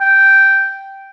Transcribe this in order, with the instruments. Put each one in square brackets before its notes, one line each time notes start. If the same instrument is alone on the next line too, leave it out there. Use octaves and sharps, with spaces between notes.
[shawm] G5